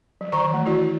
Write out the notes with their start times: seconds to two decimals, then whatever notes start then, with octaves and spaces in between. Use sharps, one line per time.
0.21 F#3
0.32 D#3 D5 A#5 C#6
0.50 E3 A3
0.66 E4 F#4 D5